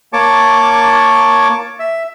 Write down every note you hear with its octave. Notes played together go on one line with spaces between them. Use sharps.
A#3 C#5 A5 C#6 D6
E5